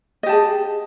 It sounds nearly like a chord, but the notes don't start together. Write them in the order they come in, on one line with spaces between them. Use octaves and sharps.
D#5 G4 A5 G#4